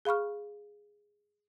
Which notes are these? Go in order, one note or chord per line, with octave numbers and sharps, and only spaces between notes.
G#4 F5 B5 C#6 F6